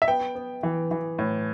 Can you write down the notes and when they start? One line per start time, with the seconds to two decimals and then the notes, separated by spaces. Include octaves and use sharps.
0.02 E5
0.08 B3 G5
0.35 B3
0.63 E3
0.91 E3
1.19 A2